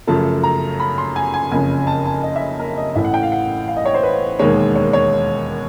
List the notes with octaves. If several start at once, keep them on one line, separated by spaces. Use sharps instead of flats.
F#2 C#3 F3 A3 A5
A#5
B5
C6
G#5
G#5
F#1 F2 C#3 G#5
A5
A5
D#5
E5
A#4
D#5
A1 A2 E3 E5
F#5
G5
F5
F#5
F5
D#5
C#5
C5
B4
E1 D#2 D#3 G#3 C#5
C#5
C#5